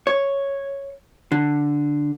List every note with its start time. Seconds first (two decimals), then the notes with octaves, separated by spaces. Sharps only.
0.07 C#5
1.32 D3